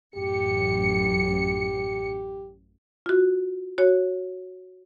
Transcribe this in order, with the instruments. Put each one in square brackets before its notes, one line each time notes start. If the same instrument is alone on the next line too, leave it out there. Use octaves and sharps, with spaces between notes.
[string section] A1 F#2 C#7 [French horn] G4
[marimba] F4 F#4
F#4 C#5